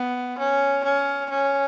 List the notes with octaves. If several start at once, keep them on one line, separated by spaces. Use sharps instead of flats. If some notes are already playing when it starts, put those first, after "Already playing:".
Already playing: B3
C#4
C#4
C#4